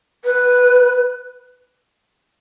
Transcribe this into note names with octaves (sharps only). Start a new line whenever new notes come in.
B4